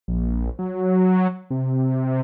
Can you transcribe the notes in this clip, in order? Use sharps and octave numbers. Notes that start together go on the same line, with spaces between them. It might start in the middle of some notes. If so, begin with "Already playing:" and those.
A#1
F#3
C3